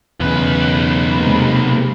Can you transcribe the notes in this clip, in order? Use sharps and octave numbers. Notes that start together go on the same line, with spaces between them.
B1 E2 C#3 B4
C3 G#3 A#3 C4